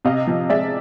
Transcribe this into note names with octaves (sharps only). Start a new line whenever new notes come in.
C3 D#5 F5
F3
G#3 D5 E5